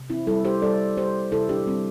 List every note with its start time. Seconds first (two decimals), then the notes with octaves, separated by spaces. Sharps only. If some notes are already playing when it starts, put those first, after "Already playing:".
Already playing: C3
0.10 C4 E4
0.27 G3 E4 A4
0.45 G4 C5
0.62 G3 A4 D5
0.97 G3 G4 C5
1.32 C3 E4 A4
1.49 D4 G4
1.66 G3 C4